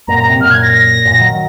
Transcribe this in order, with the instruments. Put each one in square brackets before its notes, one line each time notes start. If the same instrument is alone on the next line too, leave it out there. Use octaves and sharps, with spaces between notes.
[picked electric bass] F#2 A#2 [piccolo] A#5
[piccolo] A#5
[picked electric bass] C3
[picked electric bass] F#2 A#2 [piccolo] F6
[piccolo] G#6
A#6
A#6
[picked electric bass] F#2 A#2
D#3 F#3